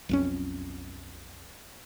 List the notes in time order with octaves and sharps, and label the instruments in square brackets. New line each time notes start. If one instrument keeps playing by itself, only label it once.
[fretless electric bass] B1 F2 C#4